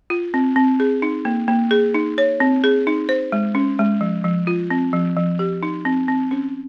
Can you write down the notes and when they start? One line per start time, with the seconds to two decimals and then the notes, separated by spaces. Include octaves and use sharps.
0.10 F4
0.34 C4
0.56 C4
0.80 G#4
1.02 D#4
1.25 A#3
1.48 A#3
1.71 G#4
1.94 D#4
2.18 C#5
2.40 C4
2.64 G#4
2.87 D#4
3.09 C5
3.32 G#3
3.55 C#4
3.79 G#3
4.01 F3
4.24 F3
4.47 F4
4.70 C4
4.93 F3
5.17 F3
5.39 G4
5.63 D#4
5.85 C4
6.08 C4
6.31 C#4